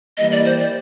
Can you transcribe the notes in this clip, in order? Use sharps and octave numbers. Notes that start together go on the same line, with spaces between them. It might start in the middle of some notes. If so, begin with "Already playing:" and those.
E3 G3 A#3 D#5
D5
C5
D5